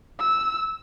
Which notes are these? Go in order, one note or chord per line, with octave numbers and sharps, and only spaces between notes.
E6